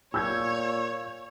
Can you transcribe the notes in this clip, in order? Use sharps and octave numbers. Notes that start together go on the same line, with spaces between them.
A#2 C#5 E6 G6 G#6